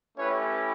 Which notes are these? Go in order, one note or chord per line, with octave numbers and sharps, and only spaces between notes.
A3 C#4 E4 G4 B4 C#5